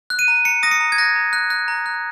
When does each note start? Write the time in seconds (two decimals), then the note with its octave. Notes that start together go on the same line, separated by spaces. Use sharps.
0.10 F#6
0.19 D#7
0.28 A#5
0.45 A#5 C#7
0.63 D#6 A#6
0.71 C#7
0.80 A#5
0.92 G#6
0.98 F#6 A#6
1.16 A#5
1.33 F#6
1.50 F#6
1.68 A#5
1.86 F#6